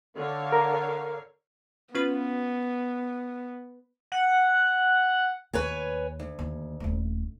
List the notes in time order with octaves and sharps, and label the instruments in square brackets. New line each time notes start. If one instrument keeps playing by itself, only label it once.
[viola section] D3 C#5 F5
[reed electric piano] A#4
[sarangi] B3 [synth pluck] C#4 F4 B4
[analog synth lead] F#5
[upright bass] D#2 [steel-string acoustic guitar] B4 C#5 G#5
[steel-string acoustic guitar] D2
[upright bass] D#2
D#1 A3